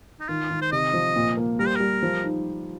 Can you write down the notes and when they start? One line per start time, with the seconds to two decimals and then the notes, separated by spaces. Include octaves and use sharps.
0.20 D#4
0.29 D#3 F4
0.51 D#3
0.62 C5
0.72 C3 D#5
0.93 F3
1.16 A#2
1.37 A#3
1.59 G3 A#4
1.67 C5
1.76 G3 A#4
2.03 F3
2.23 D#4